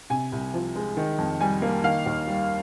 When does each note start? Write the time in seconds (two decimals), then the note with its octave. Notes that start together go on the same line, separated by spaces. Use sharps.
0.10 C3 G#5
0.32 C2
0.54 F3
0.76 G#3
0.97 D#3
1.18 F2
1.41 G3 G#5
1.62 A#3
1.84 D#3 F5
2.06 D#2
2.27 G3